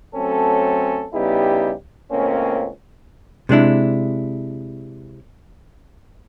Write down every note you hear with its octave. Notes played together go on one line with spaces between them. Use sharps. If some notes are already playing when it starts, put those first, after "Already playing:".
F#3 A3 C4 C#4 A4
C#3 G3 B3 D#4 E4 G4
C#2 A2 A#3 C4 C#4
C3 G#3 D4 E4